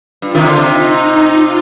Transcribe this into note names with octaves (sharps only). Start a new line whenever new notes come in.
G2 F4
C3 D#3
D3
C3 D#4
F4